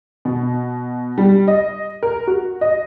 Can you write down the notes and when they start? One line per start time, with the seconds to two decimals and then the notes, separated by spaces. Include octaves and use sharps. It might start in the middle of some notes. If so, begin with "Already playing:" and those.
0.25 B2
1.18 G3
1.48 D#5
2.03 A#4
2.27 F#4
2.61 D#5